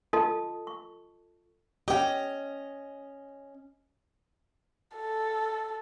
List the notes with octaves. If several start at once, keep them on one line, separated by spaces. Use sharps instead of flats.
F4 A4 D#5 A5 C6 D#6
C#6
C#4 G4 D#5 G5
A4